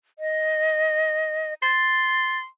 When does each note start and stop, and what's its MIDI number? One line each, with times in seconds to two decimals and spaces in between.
0.19 1.54 75
1.63 2.46 84
1.63 2.39 93